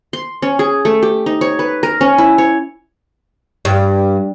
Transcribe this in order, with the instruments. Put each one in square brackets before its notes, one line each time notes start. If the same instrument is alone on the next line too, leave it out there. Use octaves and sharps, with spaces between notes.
[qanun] C6
C#4
G#4
A3
G4
D#4
C#5
B4
A#4
C#4
E4
C#5
[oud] G2